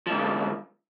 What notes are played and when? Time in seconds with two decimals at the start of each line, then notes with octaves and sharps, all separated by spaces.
0.07 F3
0.10 G#2
0.14 D3